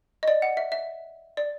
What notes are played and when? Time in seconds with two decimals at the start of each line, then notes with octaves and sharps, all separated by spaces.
0.23 D#5
0.28 D5
0.42 F#5
0.57 E5
0.72 E5
1.37 D5